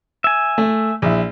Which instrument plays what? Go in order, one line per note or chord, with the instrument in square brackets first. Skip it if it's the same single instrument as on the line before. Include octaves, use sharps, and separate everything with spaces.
[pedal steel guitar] E5 G#5
[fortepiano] A3
A#1 E4